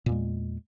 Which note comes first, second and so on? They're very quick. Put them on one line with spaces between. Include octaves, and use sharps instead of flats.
A#2 E2 G#3